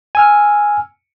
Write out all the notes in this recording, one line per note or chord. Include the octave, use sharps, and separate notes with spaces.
G#5 E6 F6